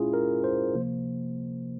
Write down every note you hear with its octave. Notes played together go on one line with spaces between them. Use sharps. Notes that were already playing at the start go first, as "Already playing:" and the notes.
Already playing: A#2 G#3 C#4 E4 F4 G#4
A#4
C5
C3 F3 A#3